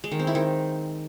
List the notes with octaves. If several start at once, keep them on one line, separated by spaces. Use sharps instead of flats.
G#3
D#3
C4
E4
D#3